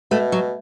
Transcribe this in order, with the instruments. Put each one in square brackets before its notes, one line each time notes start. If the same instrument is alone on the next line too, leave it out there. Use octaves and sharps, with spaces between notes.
[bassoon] B2 [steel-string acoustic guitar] A3
[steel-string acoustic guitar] F#3